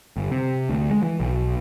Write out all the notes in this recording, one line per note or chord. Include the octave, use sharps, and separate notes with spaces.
G1
C3
D2
G#3
E3
B1